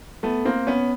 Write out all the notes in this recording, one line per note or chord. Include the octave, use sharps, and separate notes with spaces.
A3 B3
A#3 C4
B3 C#4